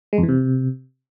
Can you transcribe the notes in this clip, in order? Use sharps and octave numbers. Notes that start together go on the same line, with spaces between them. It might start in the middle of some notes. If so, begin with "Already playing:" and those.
G#3
F2
E3
C3